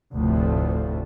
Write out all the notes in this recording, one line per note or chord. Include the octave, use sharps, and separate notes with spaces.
F1 D2 A2 C3 F3 A3